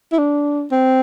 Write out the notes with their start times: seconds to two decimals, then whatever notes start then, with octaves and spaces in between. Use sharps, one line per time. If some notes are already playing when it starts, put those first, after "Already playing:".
0.12 E4
0.18 D4
0.71 C4